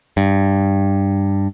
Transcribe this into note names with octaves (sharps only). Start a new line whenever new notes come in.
G2